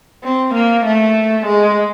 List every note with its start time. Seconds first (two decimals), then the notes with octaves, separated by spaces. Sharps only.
0.24 C4
0.54 A#3
0.86 A3
1.46 G#3